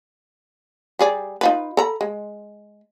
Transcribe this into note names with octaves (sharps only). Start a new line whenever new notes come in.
G3 G#4 D5
D#4 F4 B4
A4 A#5 B5
G#3